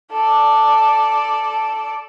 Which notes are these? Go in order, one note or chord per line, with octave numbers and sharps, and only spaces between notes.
A4 D5